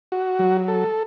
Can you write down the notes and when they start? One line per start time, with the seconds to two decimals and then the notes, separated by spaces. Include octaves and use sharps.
0.12 F#4
0.39 F#3
0.68 A4